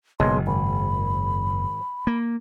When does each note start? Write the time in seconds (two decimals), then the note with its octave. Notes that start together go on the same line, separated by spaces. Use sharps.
0.20 F#1 B1 G#3 C6
0.47 G#1 B5
2.07 A#3